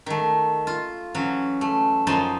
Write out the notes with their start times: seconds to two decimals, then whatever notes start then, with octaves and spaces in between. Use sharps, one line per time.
0.06 D#3 A3
0.67 F4
1.15 E3 F#3 C#4
1.61 A3
2.07 F#2 F3 D#4 G#5 A5 C6